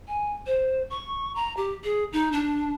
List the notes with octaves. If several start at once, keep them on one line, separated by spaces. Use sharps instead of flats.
G#5
C5
C#6
A#5
G4
G#4
D#4
D4